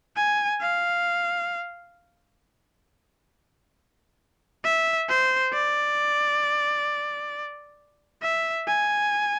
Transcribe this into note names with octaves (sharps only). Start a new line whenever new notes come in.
G#5
F5
E5
C5
D5
E5
G#5